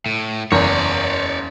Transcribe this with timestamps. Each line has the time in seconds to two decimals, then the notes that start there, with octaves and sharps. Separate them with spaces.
0.06 A2
0.52 F#1 E2 C#5 D5